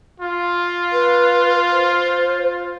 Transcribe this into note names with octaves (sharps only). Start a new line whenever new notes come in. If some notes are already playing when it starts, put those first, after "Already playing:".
F4
B4
C5